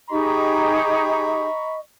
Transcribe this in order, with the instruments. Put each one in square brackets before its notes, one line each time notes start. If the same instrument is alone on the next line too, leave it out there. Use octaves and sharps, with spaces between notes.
[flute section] D#4 G4 G#4 [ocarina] D#5 [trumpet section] A#5 B5 C#6